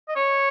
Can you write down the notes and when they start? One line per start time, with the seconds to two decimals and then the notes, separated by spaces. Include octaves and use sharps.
0.08 D#5
0.16 C#5